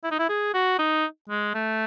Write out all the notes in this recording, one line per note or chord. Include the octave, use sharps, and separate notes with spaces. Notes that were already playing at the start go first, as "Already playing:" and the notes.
E4
D#4
E4
G#4
F#4
D#4
G#3
A3